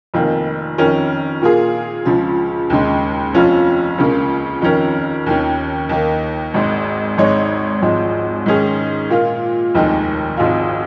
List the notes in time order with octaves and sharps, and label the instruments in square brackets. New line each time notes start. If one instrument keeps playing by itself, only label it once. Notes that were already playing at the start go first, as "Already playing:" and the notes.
[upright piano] F1 F2 D#3 A#3
F2 D#3 C#4 A#4
A#2 A#3 F4 G#4
C#2 C#3 F3
D#2 C#3 G#3
F1 F2 F3 C#4 F4
C#2 C#3 A#3
F2 D#3 C#4 A#4
D#2 D#3 C#4
D#2 D#3 A#3
G#1 G#2 G#3
G#1 G#2 G#3 D#4 C#5
G#1 G#2 F3 G#3
G#2 D#3 C#4 G#4
A#2 A#3 F4
F1 D#2 D#3 G#3 D#4
G#1 G#2 F3 G#3 F4